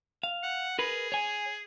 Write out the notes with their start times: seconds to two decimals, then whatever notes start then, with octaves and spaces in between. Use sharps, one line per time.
0.23 F5
0.43 F#5
0.79 G#4 A#4 B4 B5
1.12 C#5 G#5